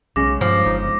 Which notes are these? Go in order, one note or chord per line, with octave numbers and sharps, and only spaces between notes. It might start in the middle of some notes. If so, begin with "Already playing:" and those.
B1 C#3 G#3 C#4 D6 A#6
G2 F3
G1 D#4